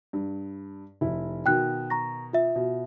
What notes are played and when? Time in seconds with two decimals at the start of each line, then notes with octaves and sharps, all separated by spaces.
0.13 G2
1.01 F1 E4
1.46 B2 D#3 G5 F#6
1.90 A#5 C#6 A#6
2.33 F4 E5
2.56 B2